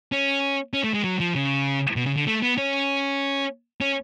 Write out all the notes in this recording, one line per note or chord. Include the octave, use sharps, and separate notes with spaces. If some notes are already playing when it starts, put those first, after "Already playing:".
C#4
C#4
A3
G#3
F#3
F3
C#3
B2
C#3
D3
A3
B3
C#4
C#4